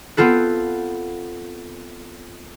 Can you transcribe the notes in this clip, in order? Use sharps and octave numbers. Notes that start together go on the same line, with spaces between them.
B3 C4 F4 A4 B4